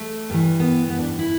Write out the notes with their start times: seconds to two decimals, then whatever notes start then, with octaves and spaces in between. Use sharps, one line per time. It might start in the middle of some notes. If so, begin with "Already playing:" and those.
Already playing: A3
0.30 G2 E3
0.60 B3
0.89 B3
0.99 D4
1.19 E4